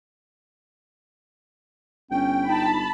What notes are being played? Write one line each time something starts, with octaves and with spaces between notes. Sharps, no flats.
G1 C#4 G5
D#4 A5 B5